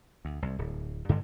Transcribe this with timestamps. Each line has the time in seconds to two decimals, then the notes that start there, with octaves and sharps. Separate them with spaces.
0.25 D2
0.42 C2
0.59 D1
1.09 G2 D3 D#3 G#3